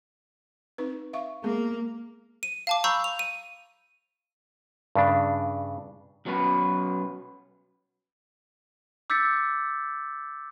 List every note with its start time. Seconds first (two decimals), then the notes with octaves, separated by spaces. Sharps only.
0.78 C4 D#4 B4
1.13 E5 F5 C#6
1.44 G#3 A#3 B3 G#4
2.43 D#7
2.67 F5 A5 D6
2.84 A#5 B5 C#6 E6 G6
3.04 F7
3.19 D#7
4.95 G2 C#3 D4
6.25 B1 F#3 B3 C#4 B4
9.10 D6 E6 G6 A6 B6 C#7